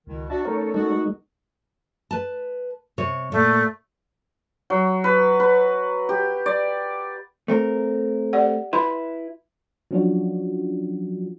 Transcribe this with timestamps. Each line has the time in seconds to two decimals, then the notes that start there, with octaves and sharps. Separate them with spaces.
0.07 C#2 B2 D#3 E4
0.30 D4 F#4 D#5 E5 A5
0.45 A3 C#4 D#4 A4 A#4 C#5
0.74 G#3 D#4 F#4
2.11 B4 A5
2.98 C3 C#5
3.32 A#2 A3
4.70 F#3
5.04 B4
5.40 B4
6.09 G4
6.46 D5
7.48 A3 C4 A#4
8.33 G4 D5 F#5
8.73 E4 B4 E5 B5 C6
9.91 F3 F#3 C#4 D4 F4 F#4